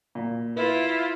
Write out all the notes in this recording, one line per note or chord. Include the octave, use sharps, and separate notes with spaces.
A#2
E4 F4 B4